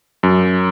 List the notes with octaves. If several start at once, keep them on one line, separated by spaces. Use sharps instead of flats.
F#2